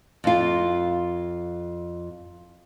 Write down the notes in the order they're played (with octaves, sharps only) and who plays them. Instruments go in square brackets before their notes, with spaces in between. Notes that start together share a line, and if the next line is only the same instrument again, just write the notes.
[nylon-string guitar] F2 F4